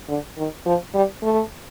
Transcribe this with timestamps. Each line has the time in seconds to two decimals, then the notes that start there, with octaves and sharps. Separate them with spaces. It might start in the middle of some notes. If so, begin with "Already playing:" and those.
0.09 D3
0.38 D#3
0.66 F3
0.94 G3
1.23 A3